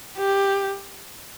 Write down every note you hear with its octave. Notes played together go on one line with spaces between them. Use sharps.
G4